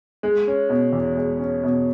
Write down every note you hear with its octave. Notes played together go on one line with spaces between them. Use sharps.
G#3
C#4
B2
E2
G#3
C#4
B2